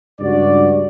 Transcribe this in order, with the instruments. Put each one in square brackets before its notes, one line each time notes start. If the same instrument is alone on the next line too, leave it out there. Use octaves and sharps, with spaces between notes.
[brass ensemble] C#2 G2 F#4 D5